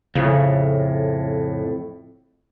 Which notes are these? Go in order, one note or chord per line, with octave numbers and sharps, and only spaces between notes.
F2 A2 C#3